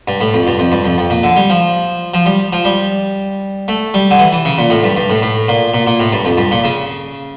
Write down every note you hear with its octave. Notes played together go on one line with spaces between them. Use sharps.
G2
A2
F2
G2
F2
G2
F2
F2
A#2
D3
G3
F3
F3
G3
F3
G3
A3
G3
D3
E3
E3
C#3
A#2
A2
G2
G2
A2
A2
A#2
A#2
A#2
A2
G2
F2
G2
A#2
C#3